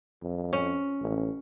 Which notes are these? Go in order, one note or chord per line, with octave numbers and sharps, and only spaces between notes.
F2
C#4
A1